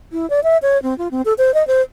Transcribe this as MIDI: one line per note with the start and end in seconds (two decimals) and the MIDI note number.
0.12 0.28 64
0.30 0.40 74
0.44 0.57 76
0.62 0.81 73
0.83 0.96 60
0.98 1.08 65
1.11 1.22 60
1.25 1.33 69
1.38 1.54 72
1.54 1.65 75
1.67 1.82 72